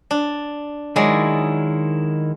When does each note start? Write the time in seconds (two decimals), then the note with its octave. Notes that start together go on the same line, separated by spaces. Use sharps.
0.11 D4
0.96 D#3 F#3 G#3 E4 D5